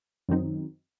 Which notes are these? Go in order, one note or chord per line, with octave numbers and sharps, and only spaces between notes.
F#2 D#3 F#3 C4 D#4